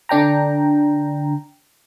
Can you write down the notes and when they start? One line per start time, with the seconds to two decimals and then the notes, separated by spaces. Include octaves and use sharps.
0.09 D3 D4 G5 A#5